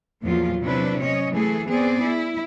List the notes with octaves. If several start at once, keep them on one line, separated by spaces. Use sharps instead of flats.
E2 A#2 F3 F#3 F4
C3 F#3 D4 E4 B4
C#4 C#5 D#5
E3 A3 G#4 A4
B3 C4 G#4 D5
E4